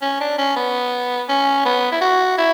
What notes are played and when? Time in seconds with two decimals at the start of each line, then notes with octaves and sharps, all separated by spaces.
0.02 C#4
0.21 D4
0.38 C#4
0.56 B3
1.29 C#4
1.65 B3
1.92 E4
2.01 F#4
2.38 E4